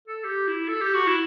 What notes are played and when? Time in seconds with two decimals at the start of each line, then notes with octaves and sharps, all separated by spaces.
0.08 A4
0.24 G4
0.48 E4
0.68 A4
0.81 G4
0.94 F#4
1.07 E4